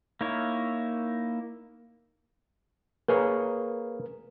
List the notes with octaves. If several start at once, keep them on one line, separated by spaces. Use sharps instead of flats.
A#3 D#4 E4 C#5
A#3 G#4 A#4 B4 C#5